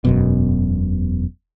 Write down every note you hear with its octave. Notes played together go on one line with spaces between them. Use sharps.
E1 F#2 B2